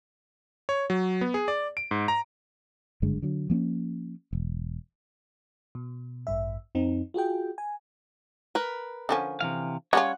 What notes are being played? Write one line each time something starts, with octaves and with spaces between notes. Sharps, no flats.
C#5
F#3
B3
G#4
D5
D7
G#2
A#5
F#1 G2 D3 G#3
D3 F#3
F3 A#3 C4 C#4
E1
B2
A1 G2 E5
F2 C4 D#4
F4 F#4 G#4 G5
G#5
A#4 B4
D3 F3 C#4
C3 E3 F5
G3 C#4 F4 C#5 F#5